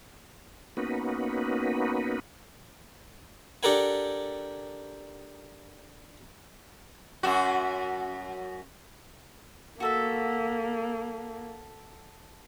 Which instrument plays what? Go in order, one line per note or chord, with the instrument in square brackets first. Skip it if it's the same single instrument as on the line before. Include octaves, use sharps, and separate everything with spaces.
[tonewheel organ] A#3 B3 C#4 D#4 F#4 B4
[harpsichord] D4 G4 A4 A#4 F#5 G#5
[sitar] F#2 F#4
[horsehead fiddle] A#3 [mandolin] F#4 A4 E5